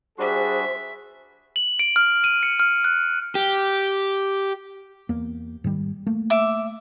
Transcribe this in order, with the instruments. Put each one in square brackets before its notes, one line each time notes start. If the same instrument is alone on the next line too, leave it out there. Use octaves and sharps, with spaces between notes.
[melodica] G3 D4 F#4 [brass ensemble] G#4 [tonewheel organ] C5 [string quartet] E5
[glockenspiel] F#7
D7
F6
D#7
C#7
F6
F#6
[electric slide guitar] G4
[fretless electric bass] E2 A#3
G#2 D#3 G3
A3 A#3
[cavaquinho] E5 D6